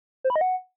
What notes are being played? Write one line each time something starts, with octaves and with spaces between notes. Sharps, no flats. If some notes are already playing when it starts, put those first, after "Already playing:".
C5
B5
D#5
F#5